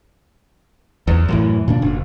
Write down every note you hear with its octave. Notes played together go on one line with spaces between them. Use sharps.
E2
F#2 A2 E3
A#2 C#3 D4
F#1